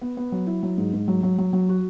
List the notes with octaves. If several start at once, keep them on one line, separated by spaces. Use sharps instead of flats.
B3
B3
F#3
E4
F#3
G#2
G#2
F#3
F#3
F#3
F#3
F#4